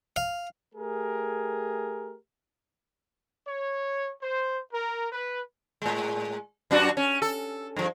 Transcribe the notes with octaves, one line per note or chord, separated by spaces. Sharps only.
F5
A3 G4 G#4 A#4
C#5
C5
A#4
B4
A2 G#3
F#2 D4 F#4
C#4
A4
G2 F3